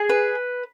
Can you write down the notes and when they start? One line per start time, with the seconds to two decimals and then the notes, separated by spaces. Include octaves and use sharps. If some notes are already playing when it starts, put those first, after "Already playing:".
Already playing: G#4
0.09 B4